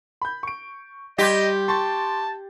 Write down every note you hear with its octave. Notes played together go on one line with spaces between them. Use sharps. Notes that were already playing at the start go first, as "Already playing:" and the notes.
B5 G6
C#6 D7
G3 G4 D#5 C6 G#6
A5 C6 C#6 A6